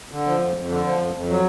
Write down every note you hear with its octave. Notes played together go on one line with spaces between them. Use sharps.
D3
F3
F2
F2
D3
F3
F2
F2
F#3